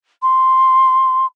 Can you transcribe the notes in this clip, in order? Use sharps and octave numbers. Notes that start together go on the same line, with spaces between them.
C6